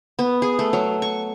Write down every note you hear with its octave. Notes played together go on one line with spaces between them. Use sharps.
B3
G#4
A3
F#3
C#6